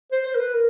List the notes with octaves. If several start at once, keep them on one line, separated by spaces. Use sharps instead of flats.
C5
C5
A#4
B4
A#4